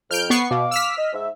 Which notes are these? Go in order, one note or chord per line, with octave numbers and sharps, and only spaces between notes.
F2 F6 G6 D7
B3 C#6 C7
B2 F5 D6
E6 F6 B6
D#5
G#2 E5